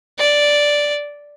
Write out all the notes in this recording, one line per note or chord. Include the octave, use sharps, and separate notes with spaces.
D5